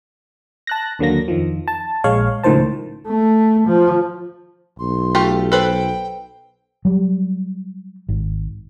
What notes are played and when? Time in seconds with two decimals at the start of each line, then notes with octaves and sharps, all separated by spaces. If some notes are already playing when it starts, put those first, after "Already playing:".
0.67 A5 F#6 A#6
0.99 D#2 D3 F#3 A#3 A#6
1.28 F2 D#3 F3
1.68 A5
2.04 A#1 G#3 C#5 F5
2.43 C#2 A2 D#3 F3 C5 A5
3.07 A3
3.68 F3
4.79 B1 C6
5.15 A3 F4 G4
5.52 A4 B4 C5 G5
6.85 F#3 G3
8.09 G#1